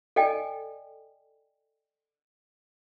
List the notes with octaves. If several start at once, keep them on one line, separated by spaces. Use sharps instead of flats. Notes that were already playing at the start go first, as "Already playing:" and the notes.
A4 D5 D#5 G5 G#5